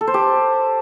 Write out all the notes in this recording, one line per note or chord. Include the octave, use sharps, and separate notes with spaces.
A4
C5
G4